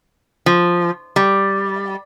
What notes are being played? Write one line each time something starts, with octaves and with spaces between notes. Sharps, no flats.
F3
G3